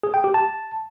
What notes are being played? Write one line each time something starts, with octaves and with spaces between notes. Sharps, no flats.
G#4
G5
G4
A5